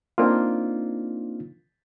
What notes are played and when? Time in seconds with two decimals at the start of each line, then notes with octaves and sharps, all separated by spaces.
0.18 A#3 C4 D4 D#4 F4